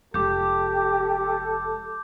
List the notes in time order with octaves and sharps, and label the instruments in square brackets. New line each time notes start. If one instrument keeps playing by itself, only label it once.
[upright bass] F1 G#3 [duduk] G4 [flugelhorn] A4 [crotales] D6 G6